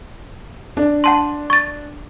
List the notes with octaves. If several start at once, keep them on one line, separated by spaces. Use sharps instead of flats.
D4
F#5 A5 C6
C#6 A6